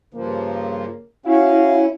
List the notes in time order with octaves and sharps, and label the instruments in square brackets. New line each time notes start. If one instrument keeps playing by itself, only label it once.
[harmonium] G2 F3 [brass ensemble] C#3 A#3
[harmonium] C#4 [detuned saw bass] E4 [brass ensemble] F#4 F5